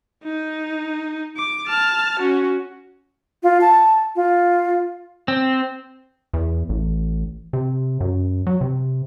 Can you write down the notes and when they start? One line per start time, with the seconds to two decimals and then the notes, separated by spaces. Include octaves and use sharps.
0.24 D#4
1.37 D6
1.67 A5 F6
2.19 C#4 F#4
3.43 F4
3.61 A5
4.16 F4
5.28 C4
6.34 E2
6.69 A1
7.53 C3
8.01 F#2
8.47 F#3
8.61 C3